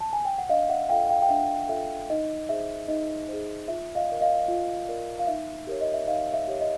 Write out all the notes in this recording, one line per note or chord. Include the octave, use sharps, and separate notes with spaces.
A5
G#5
G5
F#5
D4 D#5 F5
E5 F#5
F4 A4 F5 G5
F5 G5
G5
D4 E5 F#5
F4 A4 E5
D#4 D#5
G#4 C5 E5
D#4 D#5
G#4 C5
F4 E5
D#5 F5
A#4 D5
D#5 F5
F4
A#4 D5
F5
D#4 E5
G4 A#4 C#5
D#5
E5
D#4 D#5 F5
E5
G4 A#4 C#5
D#5